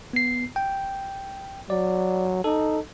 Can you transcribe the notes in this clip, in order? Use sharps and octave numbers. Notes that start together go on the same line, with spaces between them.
B3 C7
G5
F#3 D5
D#4 A4